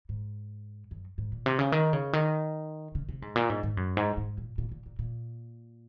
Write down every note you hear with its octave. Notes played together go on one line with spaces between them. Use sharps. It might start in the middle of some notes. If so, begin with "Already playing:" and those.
G#2
F#2
G#2
A#2
C3
C#3
D#3
C#3
D#3
C#3
C3
G#2
A#2
G#2
G#2
F#2
G#2
G#2
A#2
A#2
A#2
A#2
A#2